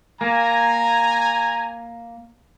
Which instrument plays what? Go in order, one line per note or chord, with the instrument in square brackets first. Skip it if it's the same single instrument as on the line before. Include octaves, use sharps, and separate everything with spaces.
[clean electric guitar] A#3 [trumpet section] G#5 A#5